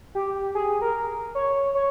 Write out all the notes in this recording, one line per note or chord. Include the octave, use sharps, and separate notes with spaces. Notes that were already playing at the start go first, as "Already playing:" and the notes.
G4
G#4
A#4
C#5
C#5